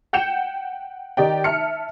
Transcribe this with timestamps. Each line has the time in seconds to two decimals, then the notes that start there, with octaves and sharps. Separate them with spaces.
0.13 F#5 G5 G6 C#7 E7
1.17 D#3 G4 D5 D#5 G5
1.44 E5 A5 F6 C#7